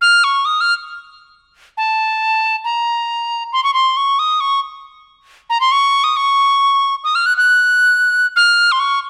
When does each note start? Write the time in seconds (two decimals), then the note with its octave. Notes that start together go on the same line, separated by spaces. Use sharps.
0.01 F6
0.24 C#6
0.45 D#6
0.61 F6
1.77 A5
2.64 A#5
3.53 C6
3.64 C#6
3.74 C6
3.97 C#6
4.19 D#6
4.40 C#6
5.50 A#5
5.60 C6
5.72 C#6
6.04 D#6
6.17 C#6
7.04 D#6
7.15 F6
7.26 F#6
7.37 F#6
8.36 F6
8.72 C6
8.80 C#6